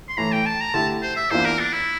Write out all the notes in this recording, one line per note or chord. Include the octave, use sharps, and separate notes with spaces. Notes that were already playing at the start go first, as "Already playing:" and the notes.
C6
A2 E3 A3 A#5
G5
A5
A#5
D3 A3 E4 G4 A5
C5
E5
E2 E3 A#3 D4 F4 C5
A#4
D4
E4